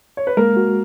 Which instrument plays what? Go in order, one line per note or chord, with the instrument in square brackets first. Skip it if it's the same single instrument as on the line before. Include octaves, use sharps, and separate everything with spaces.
[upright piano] C#5
B4
[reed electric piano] G#3 [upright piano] A#3 A#4
[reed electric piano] F#4